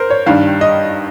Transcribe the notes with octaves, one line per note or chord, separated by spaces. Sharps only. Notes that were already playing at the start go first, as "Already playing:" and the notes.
Already playing: A#4 C5
C#5
G2 D#3 G3 F5
D#5